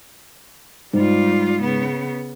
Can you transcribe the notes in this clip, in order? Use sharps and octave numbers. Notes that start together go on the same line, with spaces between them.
G#2 G3 F4
C#3 B3